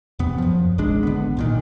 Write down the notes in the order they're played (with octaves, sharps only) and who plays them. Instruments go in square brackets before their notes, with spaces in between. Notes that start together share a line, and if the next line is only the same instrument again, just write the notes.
[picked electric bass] E2 C3 B3
F#2 F3
G#1 C#2 G#3 D4
D3 B3
B1 A#2 D#3